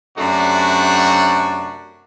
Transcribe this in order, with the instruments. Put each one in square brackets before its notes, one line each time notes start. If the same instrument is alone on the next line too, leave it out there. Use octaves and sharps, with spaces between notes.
[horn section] F#2 C3 A3 D4 F#4